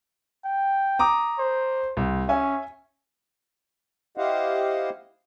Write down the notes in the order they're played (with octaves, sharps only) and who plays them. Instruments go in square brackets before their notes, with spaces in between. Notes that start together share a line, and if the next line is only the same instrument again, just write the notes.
[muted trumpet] G5
[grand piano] A#5 D6 D#6
[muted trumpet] C5
[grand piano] C2
[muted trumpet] C#4 [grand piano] E5 G#5
[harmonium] E4 G4 C5 D#5 F5 F#5